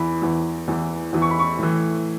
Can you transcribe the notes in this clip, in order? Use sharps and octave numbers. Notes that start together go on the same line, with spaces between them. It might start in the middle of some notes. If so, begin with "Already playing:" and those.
Already playing: E2 E3 B5
E2 E3
E2 E3
E2 E3
C#6
B5
C#6
A2 E3